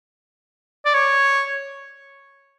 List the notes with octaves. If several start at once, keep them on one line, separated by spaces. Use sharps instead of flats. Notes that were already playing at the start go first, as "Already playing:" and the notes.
D5
C#5